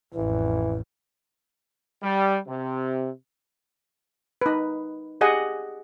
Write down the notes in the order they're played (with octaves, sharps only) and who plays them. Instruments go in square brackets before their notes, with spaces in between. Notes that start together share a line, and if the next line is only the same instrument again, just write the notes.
[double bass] A1 F2 [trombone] E3
[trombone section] G3
C3
[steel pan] D#4 B4
G4 G#4 D#5 F#5 G#5